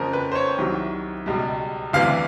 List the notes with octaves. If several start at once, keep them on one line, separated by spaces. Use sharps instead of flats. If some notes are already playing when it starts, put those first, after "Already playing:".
Already playing: F2 C#3 F3 A#4
B4
C5
C#5
C2 C3 D#3 F#3
C#2 B2 G3
D2 C3 E3 G3 F5